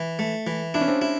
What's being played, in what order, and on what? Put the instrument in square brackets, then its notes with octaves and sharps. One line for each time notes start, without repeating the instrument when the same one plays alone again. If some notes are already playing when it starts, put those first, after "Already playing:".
Already playing: [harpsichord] E3
A3
E3
[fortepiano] D4 [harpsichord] E4
[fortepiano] C#4
C4 D4
[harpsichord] E4